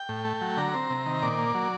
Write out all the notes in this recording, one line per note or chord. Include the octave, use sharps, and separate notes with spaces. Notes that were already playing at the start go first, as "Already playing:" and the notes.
Already playing: G5
A2
A3
F#3
D3 A#5
C4
C3
D#3
A#2 D5
A#3
F#3